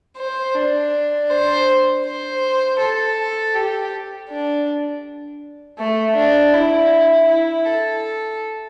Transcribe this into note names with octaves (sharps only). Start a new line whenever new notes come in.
C5
D4
C5
C5
A4
G4
D4
A3
D4
E4
E4
A4